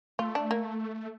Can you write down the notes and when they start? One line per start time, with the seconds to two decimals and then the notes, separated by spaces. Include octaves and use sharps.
0.19 A3 F4
0.35 D4
0.51 A#3